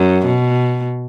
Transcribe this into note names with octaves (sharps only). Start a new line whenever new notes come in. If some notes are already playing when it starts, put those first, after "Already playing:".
Already playing: F#2
B2